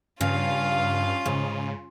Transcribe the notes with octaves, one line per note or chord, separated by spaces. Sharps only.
G2 C#3 C#4 F4 F5
G#2 C#3